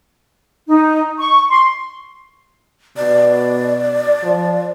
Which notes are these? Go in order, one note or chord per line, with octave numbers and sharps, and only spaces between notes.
D#4
C#6
C6
B2 D5
F3